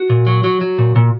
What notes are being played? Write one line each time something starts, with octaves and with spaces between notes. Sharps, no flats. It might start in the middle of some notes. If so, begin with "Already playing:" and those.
Already playing: F#4
A#2
F#3
F#3
F#3
A#2
A#2